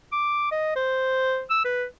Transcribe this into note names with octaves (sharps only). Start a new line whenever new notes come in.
D6
D#5
C5
E6
B4